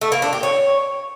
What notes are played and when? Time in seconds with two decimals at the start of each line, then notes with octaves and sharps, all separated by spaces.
0.01 A3
0.12 A#3
0.22 D4
0.33 G4
0.43 C#5